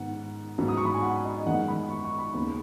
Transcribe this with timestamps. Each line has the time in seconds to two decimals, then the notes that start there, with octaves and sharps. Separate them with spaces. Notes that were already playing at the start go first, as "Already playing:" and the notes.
Already playing: G#2 D#3 B3 F#5
0.58 G#2 F#3 B3
0.68 D#6
0.77 C#6
0.85 B5
0.94 G#5
1.02 F#5
1.25 D#5
1.46 F#2 D#3 G#3 B3 F#5
1.68 B5
1.90 C#6
2.04 C#6
2.19 B5
2.34 D#2 C#3 B3